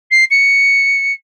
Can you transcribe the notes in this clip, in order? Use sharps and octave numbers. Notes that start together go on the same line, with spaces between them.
C7
C#7